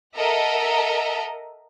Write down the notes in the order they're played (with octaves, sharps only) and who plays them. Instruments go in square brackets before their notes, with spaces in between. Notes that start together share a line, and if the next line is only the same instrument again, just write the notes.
[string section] A4 A#4 D#5 E5 F#5 A#5